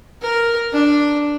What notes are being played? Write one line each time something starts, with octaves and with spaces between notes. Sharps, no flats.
A#4
D4